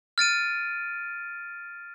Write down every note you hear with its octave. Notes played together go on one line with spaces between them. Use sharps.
F6 A6 D7 D#7